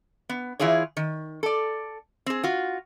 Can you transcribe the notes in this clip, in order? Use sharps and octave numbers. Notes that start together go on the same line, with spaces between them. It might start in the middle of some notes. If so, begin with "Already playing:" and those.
B3
E3 E4 F4 G#4 C#5
D#3
A4 D5
C4 G#4
F4 F#4